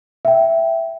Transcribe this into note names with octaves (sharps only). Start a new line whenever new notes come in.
E5 G5